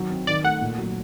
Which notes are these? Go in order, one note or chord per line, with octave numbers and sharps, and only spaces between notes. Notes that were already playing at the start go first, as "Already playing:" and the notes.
Already playing: D#3 F#3
C4
D#3 D5
A3 F#5
A#2
F#3